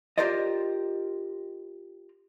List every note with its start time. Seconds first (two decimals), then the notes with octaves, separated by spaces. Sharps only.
0.18 F4 G4 A#4 C5 D5 D#5